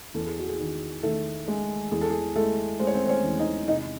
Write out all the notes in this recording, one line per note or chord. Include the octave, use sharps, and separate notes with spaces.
E2 A4
G#4
F#4
G#4
D#3
D#3 A3 A4
G#3
E2 G#4
A4
G#4
G#3 A3 A4
G#3 C5
C#5
C4 C5
C5
C#4 C#5
E2
D#4 D#5
C3 D#4 D#5